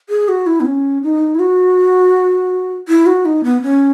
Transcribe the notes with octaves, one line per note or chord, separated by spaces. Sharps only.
G#4
F#4
E4
B3
C#4
D#4
E4
F#4
E4
F#4
D#4
B3
C#4